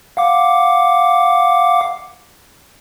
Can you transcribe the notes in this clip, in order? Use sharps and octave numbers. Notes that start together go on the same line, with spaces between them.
F5 F#5 D6